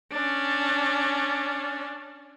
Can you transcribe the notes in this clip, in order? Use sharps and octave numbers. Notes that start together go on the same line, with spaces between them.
C#4 D4